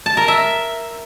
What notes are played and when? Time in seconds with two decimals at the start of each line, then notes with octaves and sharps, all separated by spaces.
0.06 A5
0.17 A#4
0.28 E5